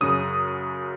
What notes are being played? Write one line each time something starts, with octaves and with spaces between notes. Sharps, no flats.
F#2 C#3 F#3 D#6